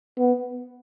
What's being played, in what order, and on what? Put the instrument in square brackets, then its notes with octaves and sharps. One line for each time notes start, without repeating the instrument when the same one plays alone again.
[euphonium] B3